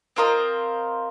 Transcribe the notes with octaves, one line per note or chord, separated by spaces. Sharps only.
C4 F4 A#4 D#5